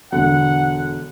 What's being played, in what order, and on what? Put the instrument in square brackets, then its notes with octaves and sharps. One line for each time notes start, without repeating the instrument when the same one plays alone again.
[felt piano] E1 D3 C#7 [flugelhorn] F#5